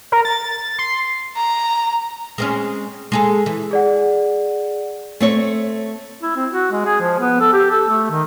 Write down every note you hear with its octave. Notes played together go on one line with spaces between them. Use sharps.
A#4
A6
C6
A#5
G#3 C4 C#4
G#3 G#4 A4
E3
G#4 D5 F#5
A3 C4 C#5
E4
C4
F#4
G#3
G#4
F3
B3
A4
G4
A4
A3
D#3